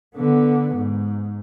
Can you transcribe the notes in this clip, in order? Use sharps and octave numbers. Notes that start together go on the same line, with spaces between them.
D3 B3
G#2